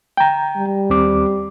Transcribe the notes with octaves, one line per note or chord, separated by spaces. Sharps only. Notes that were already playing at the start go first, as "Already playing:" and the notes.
G5 A#5
G3
D#2 C4 D6